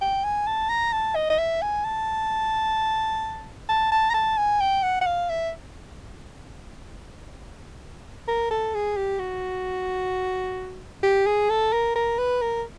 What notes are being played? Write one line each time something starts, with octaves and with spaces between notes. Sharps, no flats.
G5
G#5
A5
A#5
A5
D#5
D#5
E5
G#5
A5
A5
A5
A#5
A5
G#5
G5
F#5
F#5
F5
E5
A#4
A4
G#4
G4
F#4
G4
G#4
A4
A#4
A#4
B4
A#4